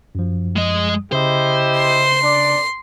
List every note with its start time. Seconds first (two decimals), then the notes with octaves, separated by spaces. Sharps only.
0.15 F#2 F3
0.56 G#3 D#5
1.12 C#3 E4 G4 C5 D#5
1.77 C6
2.23 D4 D5